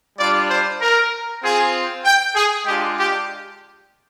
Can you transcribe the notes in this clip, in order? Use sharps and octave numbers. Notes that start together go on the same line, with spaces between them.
G3 D4 F4 D5
C5
A#4
C4 F4 G#4
G5
G#4
G#3 D4 F4 G4
G4